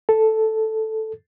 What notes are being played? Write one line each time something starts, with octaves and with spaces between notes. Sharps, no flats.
A4